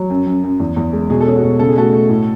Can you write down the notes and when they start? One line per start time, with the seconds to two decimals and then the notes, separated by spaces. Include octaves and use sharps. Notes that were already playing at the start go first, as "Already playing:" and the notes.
Already playing: F#3
0.10 F#2
0.27 F#2
0.43 F#2
0.60 E2
0.76 E2
0.93 G#3
1.10 B2 G#4
1.21 A4
1.26 C#4 G#4
1.36 F#4
1.43 B2
1.59 C#3 A4
1.69 G#4
1.76 A3 F#4 A4
1.93 A3
2.09 A2